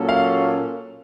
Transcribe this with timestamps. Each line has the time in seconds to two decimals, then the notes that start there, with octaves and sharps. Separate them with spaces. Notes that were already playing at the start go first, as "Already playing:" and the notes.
Already playing: A#2 F#3 A#3 C#4 A4
0.09 F5